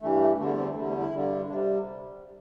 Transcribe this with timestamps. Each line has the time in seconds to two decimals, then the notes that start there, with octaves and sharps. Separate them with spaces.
0.02 G2 E3 G3 A3
0.21 A3
0.38 E2 D3 G3 A3
0.58 C4
0.75 E2 D3 G3 A3
0.89 A3
1.00 E4
1.13 G2 D3 G3
1.50 C3 G3 D4